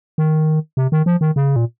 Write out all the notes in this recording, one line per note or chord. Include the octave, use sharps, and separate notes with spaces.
D#3
C3
D#3
F3
D#3
C#3
A#2